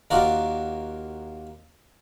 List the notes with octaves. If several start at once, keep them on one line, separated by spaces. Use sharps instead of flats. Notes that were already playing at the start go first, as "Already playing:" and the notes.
D#2 F4 F#4 A#4 D5